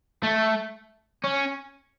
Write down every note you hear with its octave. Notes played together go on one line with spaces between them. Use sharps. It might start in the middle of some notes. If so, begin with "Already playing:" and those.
A3
C#4